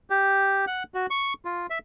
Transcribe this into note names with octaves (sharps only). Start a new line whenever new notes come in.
G4
F#5
F#4
C#6
F4
E5